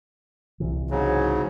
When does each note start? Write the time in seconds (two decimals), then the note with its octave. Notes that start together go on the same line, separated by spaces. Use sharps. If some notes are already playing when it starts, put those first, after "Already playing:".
0.60 C2 C3 E3
0.90 G#2 C#3 F#3